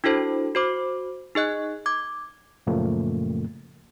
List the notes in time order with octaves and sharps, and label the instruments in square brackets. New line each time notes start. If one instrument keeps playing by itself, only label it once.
[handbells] D4 E4 F#4 A4 C5
F#4 C5 D6
D#4 G#4 D#5 F#6
D6 G#6
[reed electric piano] F#2 A#2 C#3 F3 A3 A#3